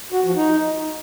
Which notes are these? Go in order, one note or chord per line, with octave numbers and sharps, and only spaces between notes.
F#4
F3
D#4